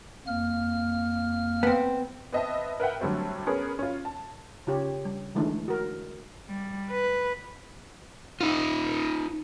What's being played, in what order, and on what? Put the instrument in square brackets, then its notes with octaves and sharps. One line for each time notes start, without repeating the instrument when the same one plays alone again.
[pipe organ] F2 A#3 F6
[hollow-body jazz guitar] B3 C4
[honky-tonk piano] B3 C4 D#5 E5 A5
A#4 B4 E5 F#5 G5
D3 F#3 G3 A3 C4
B3 C#4 G#4 A#4
C#4 F4
A5
[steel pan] C#3 F4 G4 C#5
G3
D3 E3 G#3 A3 D4 D#4
F#4 A#4
[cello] G3
B4
[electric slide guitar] D#4 F4